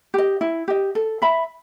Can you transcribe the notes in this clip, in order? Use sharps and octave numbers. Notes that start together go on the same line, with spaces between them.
G4 D#5
E4
G4 D#5
A4
E5 B5